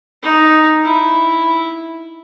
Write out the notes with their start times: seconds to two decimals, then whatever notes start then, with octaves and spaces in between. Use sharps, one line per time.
0.23 D#4
0.84 E4